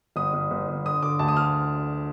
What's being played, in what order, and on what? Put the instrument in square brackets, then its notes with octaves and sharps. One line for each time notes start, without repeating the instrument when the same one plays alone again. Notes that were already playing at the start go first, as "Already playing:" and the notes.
[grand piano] G1 D#6
G1
G1
G1
D3 D#6
D3 D6
D2 A5
D#6
F6